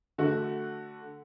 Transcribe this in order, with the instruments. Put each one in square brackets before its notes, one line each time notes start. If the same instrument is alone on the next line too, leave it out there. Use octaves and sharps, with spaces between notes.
[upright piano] D3 A3 F#4